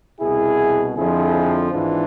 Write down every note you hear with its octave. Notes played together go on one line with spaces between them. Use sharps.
C2 B2 E4 G#4
F2 D3 F3 E4 G#4
G#1 G#2 E3 D4 F4